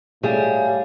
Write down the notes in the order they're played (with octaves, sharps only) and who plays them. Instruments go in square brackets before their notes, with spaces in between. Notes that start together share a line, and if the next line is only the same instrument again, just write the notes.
[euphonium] A2 [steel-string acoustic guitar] G3 G#4 [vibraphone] F5